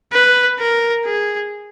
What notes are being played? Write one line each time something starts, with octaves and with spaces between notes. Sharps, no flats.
B4
A#4
G#4